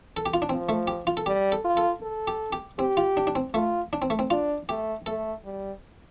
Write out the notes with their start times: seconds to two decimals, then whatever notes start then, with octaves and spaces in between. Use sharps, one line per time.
0.17 A4
0.26 G4
0.34 F4
0.42 D4
0.49 F3 C4
0.69 A3
0.87 G4
1.07 F4
1.17 A4
1.26 G3 G4
1.52 A4
1.64 F4
1.77 A4
2.03 A4
2.27 G4
2.53 G4
2.79 C4 G4
2.97 F4
3.17 D4
3.27 D4
3.35 C4
3.54 A3 F4
3.93 D4
4.02 C4
4.10 A3
4.19 C4
4.30 D4 F4
4.69 A3 G4
5.06 A3 A4
5.45 G3